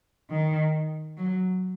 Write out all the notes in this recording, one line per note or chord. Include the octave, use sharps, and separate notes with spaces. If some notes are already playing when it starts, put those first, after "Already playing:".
D#3
F#3